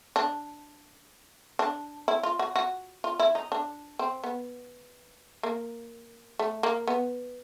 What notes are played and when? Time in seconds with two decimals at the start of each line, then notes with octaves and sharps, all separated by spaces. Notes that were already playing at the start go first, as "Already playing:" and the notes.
0.16 D4
1.59 D4
2.08 E4
2.23 F4
2.39 F#4
2.56 F#4
3.04 F4
3.19 E4
3.35 D#4
3.52 D4
3.99 C4
4.24 B3
5.43 A#3
6.39 A3
6.63 A#3
6.87 B3